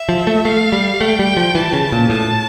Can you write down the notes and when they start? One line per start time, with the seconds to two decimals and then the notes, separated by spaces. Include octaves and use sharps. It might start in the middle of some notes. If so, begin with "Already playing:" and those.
Already playing: E5
0.09 F3
0.27 A3
0.45 A3 F5
0.72 G3
1.01 A3 G5
1.19 G3
1.37 F3
1.55 E3 A5
1.73 C#3
1.92 A#2
2.10 A2 A5